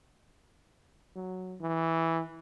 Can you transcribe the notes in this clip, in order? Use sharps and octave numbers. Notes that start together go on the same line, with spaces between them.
F#3
E3